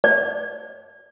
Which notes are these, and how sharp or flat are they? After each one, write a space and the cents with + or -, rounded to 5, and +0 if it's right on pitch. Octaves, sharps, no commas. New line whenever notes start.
D5 -10